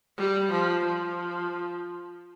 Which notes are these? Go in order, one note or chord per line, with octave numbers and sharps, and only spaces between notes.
G3
F3
F3